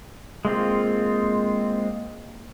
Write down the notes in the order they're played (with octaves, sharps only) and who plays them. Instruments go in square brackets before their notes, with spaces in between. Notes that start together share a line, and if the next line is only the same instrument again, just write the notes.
[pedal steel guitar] G#3 A#3 C4 F4